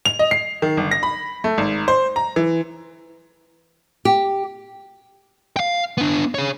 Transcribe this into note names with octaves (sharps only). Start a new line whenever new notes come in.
F7
D#5
C7
D#3
G1
A#6
B5
A3
G#1
C5
A#5
E3
G4
F5 G5
B3 D4
G#4 C#5